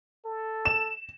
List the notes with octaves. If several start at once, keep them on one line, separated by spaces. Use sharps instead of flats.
A4
E7